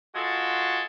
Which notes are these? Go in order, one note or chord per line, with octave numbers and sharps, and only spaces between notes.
G#3 F4 F#4 G#4 A4